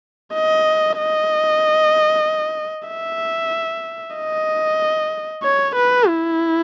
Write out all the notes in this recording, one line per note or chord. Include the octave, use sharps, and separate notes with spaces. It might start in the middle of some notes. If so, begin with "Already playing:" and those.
D#5
D#5
E5
D#5
C#5
B4
E4